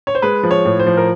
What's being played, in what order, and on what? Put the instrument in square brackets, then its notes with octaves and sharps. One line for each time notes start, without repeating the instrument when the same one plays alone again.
[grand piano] C#5
C5
G#3 B4
F3
C#5
A2
C5
F3
A#4